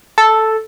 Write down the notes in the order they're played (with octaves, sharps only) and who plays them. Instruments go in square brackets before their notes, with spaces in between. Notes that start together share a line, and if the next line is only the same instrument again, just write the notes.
[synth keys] A4